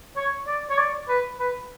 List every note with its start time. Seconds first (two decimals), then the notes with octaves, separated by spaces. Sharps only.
0.16 C#5
0.47 D5
0.70 C#5
0.77 D5
1.09 B4
1.39 B4